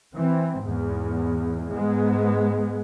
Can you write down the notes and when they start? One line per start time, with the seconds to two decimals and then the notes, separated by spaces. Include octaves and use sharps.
0.15 E3 C4
0.63 E2 G#2
1.71 G#2 G#3 B3